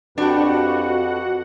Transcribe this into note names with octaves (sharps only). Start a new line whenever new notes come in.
F2 D4 F#4 G4 B4 F#5 G5